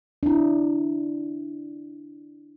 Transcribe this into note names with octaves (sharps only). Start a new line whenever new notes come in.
D4 E4